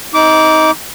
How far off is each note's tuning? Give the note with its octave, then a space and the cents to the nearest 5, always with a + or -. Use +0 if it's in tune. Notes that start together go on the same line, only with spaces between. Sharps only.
C4 +0 D#4 +20 D6 -15